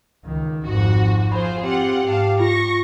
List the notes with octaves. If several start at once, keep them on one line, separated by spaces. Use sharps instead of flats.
C#2 D#3
G#1 F2 G#2 F#4
F3 F4 G#4 C5 B5
C4 F4 G4 F#5
G#2 F5 A5
F4 C#6 A#6